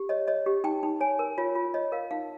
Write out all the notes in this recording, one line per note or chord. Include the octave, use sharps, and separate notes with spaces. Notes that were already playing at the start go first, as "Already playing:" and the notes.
Already playing: G4
C#5 D#5
C#5 D#5
G4
D#4 G5
D#4
C#5 G#5
A#4
F4 C#5
F4
C#5 D#5
A#4 F5
D#4 F5